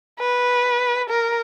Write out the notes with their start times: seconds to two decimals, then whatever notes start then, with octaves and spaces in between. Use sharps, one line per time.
0.20 B4
1.10 A#4